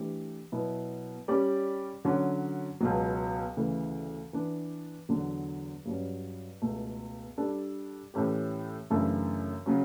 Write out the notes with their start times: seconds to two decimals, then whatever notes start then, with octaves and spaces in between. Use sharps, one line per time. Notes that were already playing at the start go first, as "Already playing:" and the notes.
Already playing: E3 A3 D4 G4
0.52 B2 F#3 B3 E4
1.28 G3 C#4 G4 D5
2.05 D3 F#3 C#4 F#4
2.81 C#2 B2 F#3
3.57 D2 C#3 E3
4.33 E3 B3 D4
5.09 E2 D3 F#3
5.85 G2 F#3 C#4
6.62 C#2 B2 A3
7.38 G3 D4 A4 D5
8.14 A2 E3 A3 C#4 G4
8.90 F#2 C#3 E3 A3 D4
9.66 C#3 F#3 C#4